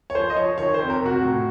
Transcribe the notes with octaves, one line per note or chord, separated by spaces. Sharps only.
C#5
F3 C5
D#5
F3 C#5
D#3 C#5
C5
F2
A#4
C3 F#4
A2